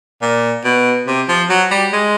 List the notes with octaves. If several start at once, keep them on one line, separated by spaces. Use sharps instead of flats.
A#2
B2
C3
F3
F#3
G3
G#3